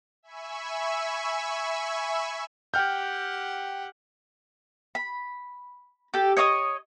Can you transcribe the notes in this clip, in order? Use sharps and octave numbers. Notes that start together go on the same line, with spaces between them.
E5 G#5 B5 C#6 E6
G4 F#5 G5 F6 G6
B5
G4 A4
C#5 D#5 C6 D#6